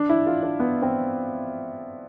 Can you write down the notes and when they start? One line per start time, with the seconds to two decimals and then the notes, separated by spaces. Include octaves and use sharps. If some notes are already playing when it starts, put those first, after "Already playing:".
Already playing: D4
0.09 E4
0.27 F4
0.43 D4
0.60 B3
0.82 C4